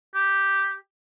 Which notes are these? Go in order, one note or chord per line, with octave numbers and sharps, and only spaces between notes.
G4